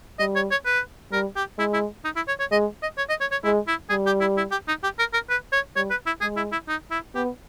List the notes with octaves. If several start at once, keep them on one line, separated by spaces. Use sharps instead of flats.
G3 D#5
C#5
C#5
B4
G3 A#4
G4
G#3 E4
E4
D#4
E4
C#5
C#5
G#3 D#5
D#5
C#5
D#5
C#5
C#5
G#3 E4
E4
G3 G#4
G4
E4
E4
G4
D#4
G4
A#4
A#4
B4
C#5
G3 C#5
B4
E4
G#3 G#4
E4
E4
D#4
E4
B3 G4